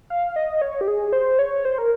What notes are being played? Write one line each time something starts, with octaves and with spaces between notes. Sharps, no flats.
F5
D#5
C#5
G4
G#4
C5
C#5
C5
A#4